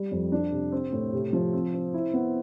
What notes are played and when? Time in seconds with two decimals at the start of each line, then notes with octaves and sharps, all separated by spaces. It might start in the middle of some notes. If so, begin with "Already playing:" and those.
Already playing: G3
0.12 F2
0.32 D4
0.52 C3
0.72 C4
0.92 A2
1.13 C3
1.33 F3
1.53 C4
1.74 C4
1.94 E4
2.14 B3